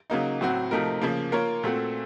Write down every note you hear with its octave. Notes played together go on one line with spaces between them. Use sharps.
C#3 F#3 A#3 D#4
A2 F#3 C4 F#4
C3 F3 A3 D#4 A#4
C#3 F3 A#3
A#3 F4 A#4 C#5
A#2 A3 C4 F#4 A4